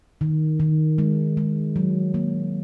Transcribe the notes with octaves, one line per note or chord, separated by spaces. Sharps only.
D#3
D#3
G#3
G#3
F#3
A#3